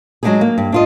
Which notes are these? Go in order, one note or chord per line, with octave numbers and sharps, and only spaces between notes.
F#3 G#3 A#3 D4 D#4 G#4
A#3
G2
D4 F4 D#5